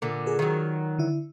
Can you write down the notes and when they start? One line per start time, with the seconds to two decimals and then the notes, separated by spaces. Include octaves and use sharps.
0.02 A#2 D3
0.26 G#4 A#4
0.39 D#3 F#3
0.98 D3 E4